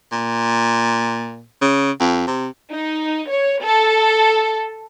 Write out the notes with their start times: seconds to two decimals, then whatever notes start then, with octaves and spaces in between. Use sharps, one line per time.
0.12 A#2
1.61 C#3
2.00 F2
2.27 C3
2.71 D#4
3.30 C#5
3.63 A4